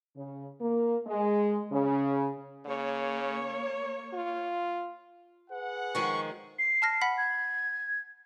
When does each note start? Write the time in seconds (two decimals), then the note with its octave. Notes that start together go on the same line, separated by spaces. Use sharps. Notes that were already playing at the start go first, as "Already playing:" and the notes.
0.16 C#3
0.60 A#3
1.06 G#3
1.72 C#3
2.66 C#3 A#3 C#5
4.13 F4
5.50 G#4 B4 F#5
5.95 D#3 F3 G#3 C#6
6.59 C7
6.82 A5 F6 A#6
7.01 F#5 B5 B6
7.18 G#6